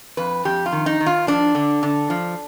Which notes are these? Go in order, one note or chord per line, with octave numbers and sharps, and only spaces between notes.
F2 B4
F2 G4
F4
D#3
D#4
D#3
F4
F3 D4
D3
D3
F3